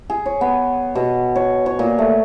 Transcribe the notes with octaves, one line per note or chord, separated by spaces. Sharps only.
G#4
C#5
B3
B2
C#5
C#5
A#2
A3